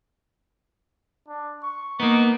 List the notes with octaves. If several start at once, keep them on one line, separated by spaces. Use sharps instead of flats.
D4
C#6
A#3 B3 D#4